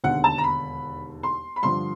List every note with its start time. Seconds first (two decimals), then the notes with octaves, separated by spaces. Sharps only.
0.04 E1 D#2 D3 F#5
0.24 A5
0.38 A#5
0.44 B5
1.23 C6
1.56 B5
1.63 G2 D3 F3 C6